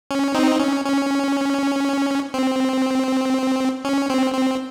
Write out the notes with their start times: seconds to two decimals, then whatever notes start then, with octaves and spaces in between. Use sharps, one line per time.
0.11 C#4
0.35 C4 D#4
0.60 C#4
0.85 C#4
2.34 C4
3.85 C#4
4.10 C4
4.33 C4